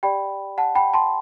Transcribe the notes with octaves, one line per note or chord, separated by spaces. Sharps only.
G4 D5 G5 B5
F#5 A5
G5 B5
A5 C6